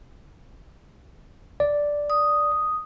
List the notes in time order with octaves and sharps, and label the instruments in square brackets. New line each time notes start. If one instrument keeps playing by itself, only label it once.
[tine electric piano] D5
[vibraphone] D#6